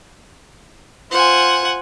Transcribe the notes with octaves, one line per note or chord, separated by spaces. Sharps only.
F4 C5 F#5 G#5